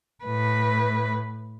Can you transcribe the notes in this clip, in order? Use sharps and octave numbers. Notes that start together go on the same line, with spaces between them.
A2 B4